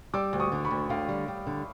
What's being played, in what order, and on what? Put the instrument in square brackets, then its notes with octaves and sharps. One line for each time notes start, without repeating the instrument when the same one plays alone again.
[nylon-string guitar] G3 [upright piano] D6 E6
[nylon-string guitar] D2
[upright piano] C#6 D#6
[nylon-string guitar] D3
[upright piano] B5 C#6
[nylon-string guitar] D2
[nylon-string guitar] D3 [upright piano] F5 G5
[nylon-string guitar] G3
G3
D3